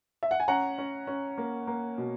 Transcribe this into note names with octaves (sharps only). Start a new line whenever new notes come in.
E5
F#5
G#5
C#4 F#5 A#5
C#4
C#4
A#3
A#3
B2